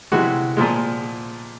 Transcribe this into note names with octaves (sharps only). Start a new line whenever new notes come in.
C3 E3 G#3 F#4
A#2 F3 G#3